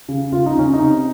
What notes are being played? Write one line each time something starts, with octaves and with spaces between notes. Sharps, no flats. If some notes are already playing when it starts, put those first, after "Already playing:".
C#3
C#3 F4
D#4
C#3 C#4
D#4
C3